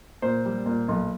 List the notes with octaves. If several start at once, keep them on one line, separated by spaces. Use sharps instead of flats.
A#2 C5
G3
A#2
B1